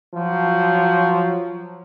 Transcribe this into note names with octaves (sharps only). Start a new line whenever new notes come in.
F3 F#3